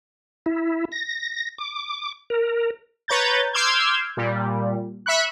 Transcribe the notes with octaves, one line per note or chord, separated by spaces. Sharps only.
E4
A#6
D6
A#4
B4 C#5 A#5 G6 A6
C6 D6 E6 F6 G6 G#6
A#2 G3
E5 B5 C#6 F#6